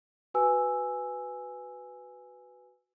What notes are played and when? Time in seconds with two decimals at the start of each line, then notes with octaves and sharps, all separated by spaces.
0.34 F#4 B4 G#5 E6